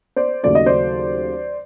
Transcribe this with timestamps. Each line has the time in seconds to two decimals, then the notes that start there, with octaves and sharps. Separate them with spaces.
0.16 C5 D5
0.43 D#2 C#3 F#3 A3 D5
0.55 D#5
0.66 C5 D5